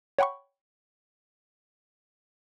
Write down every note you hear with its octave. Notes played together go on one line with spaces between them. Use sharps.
C#5 F#5 G5 B5 C#6